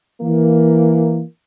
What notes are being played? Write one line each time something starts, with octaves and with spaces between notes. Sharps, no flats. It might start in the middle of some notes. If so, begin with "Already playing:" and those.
E3 A#3